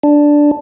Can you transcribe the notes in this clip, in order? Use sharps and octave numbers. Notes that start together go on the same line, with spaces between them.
D4